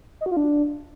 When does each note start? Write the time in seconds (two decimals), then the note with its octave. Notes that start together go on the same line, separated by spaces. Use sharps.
0.21 D#5
0.26 F#4
0.31 F4
0.37 D4